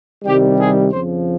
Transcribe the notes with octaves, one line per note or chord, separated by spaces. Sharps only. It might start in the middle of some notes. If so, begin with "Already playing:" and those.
C2 C3 D#3 G3 G4
G#4
F2 C#3 F3 C5